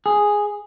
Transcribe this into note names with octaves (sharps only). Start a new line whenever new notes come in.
G#4